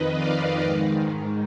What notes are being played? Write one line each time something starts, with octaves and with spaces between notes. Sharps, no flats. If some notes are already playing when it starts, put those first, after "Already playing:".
Already playing: F2 D#3 B4 D#5
D5 F5
G#2 D#3